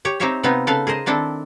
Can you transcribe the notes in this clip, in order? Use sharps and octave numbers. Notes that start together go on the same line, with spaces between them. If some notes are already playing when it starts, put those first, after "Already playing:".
G4 C#5
C4 D#4 G4 C5 C#5 E5
C3 B3 C4 D#4 F4 B4
C#3 A4 B4 F5 A5
G#4 A#4 C5 D#5
D#3 C4 D4 E4 A4